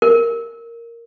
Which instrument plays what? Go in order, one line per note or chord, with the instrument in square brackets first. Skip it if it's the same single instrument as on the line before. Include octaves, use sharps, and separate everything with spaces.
[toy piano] A#4